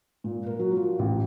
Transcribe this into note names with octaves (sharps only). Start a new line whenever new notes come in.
A#2
A#4
F#3
F3
A1